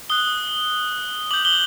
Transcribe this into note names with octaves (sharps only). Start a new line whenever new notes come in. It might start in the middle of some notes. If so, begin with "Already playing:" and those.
D#6 F#6 G7
D6 G6 F#7
G7